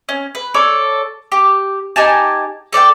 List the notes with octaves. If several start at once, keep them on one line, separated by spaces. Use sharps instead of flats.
C#4
B4
A4 C#5 D5
G4
D#4 G4 G#5 A5
A4 D5 F5 G5